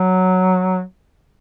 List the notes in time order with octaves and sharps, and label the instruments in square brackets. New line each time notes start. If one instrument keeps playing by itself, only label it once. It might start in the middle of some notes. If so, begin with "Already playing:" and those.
Already playing: [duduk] F#3